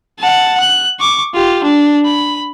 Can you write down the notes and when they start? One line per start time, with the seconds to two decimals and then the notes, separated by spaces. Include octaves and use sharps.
0.19 F#5 A5
0.60 F#6
1.00 C#6 D6
1.34 F4 G4
1.63 D4
2.05 B5